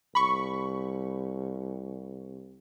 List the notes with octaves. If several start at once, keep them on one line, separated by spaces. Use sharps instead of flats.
C2 B5 C#6